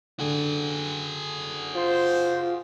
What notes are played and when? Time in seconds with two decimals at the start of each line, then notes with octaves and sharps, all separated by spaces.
0.19 D3 F#4 G#4
1.75 F4 C5